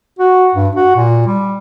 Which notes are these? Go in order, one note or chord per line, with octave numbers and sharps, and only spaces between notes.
F#4
G2
F#4
A#2
G3